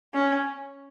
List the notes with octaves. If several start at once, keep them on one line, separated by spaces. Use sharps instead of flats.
C#4